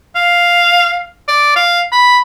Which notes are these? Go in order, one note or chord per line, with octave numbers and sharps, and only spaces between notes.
F5
D5
F5
B5